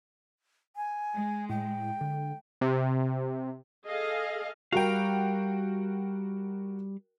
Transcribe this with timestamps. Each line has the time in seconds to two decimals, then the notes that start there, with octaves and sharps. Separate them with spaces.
0.76 G#5
1.14 G#3
1.49 A2 G5
2.01 D3
2.61 C3
3.85 G#4 A4 D#5 F5
4.72 G3 F#4 A#4 F5 G5